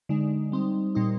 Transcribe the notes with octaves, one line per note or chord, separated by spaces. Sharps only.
D3 G#3 D#4
G3 C4 D#4
A#2 G3 C4 D#4